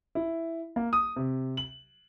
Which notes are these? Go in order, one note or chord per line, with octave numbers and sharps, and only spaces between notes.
E4
A#3
D#6
C3
F#7